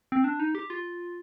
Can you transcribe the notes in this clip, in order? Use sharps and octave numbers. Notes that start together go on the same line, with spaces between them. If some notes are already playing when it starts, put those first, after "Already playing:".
C4
D4
D#4
G4
F4